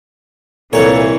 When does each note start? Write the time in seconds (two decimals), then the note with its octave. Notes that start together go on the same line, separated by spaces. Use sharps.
0.73 C2 A#2 E3 G3 C4 A4 C#5